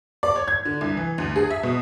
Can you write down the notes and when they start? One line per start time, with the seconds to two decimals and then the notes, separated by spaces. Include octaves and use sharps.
0.23 D5
0.36 C#5
0.48 G#6
0.65 D3
0.81 C2
0.97 E3
1.18 D2
1.36 G#4
1.51 E5
1.63 B2